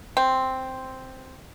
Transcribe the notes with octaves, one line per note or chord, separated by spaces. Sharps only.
C4